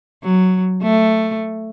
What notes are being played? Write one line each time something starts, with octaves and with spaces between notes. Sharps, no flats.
F#3
A3